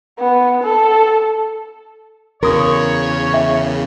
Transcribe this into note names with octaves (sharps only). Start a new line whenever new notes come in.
B3
A4
E2 C#3 F#4 A#4 C#5 D#6
G#4 E5 G5